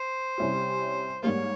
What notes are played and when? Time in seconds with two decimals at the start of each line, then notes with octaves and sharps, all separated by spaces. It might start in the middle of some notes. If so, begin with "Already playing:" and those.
Already playing: C5
0.38 C3 G3 C#4 E4 G4
1.23 G#2 G3 A#3 F4 C#5